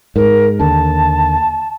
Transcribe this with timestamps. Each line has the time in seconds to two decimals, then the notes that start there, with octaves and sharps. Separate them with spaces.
0.16 G#2 A#4
0.59 D#2 D3 A5